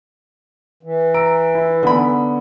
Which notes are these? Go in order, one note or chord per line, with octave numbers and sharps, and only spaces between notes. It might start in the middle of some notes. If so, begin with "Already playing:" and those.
E3
A#5 E6 D7
E4
D3 B3 D#4 B5